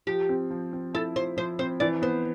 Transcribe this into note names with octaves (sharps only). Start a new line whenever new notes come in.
F3 G4
C4
F3
C4
E4 A4
F3 C5
F3 C5
C4 C5
E3 D5
B3 C5